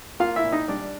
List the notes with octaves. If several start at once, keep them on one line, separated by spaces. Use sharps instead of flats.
A#3 F4 F5
E4 E5
A#2
D#4 D#5
G3 D4 D5